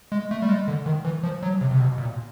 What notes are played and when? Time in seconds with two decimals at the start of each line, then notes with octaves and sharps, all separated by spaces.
0.12 G#3
0.31 A3
0.42 G3
0.49 G#3
0.68 D3
0.86 D#3
1.05 E3
1.23 F3
1.43 F#3
1.61 C3
1.71 C3
1.79 B2
1.98 A#2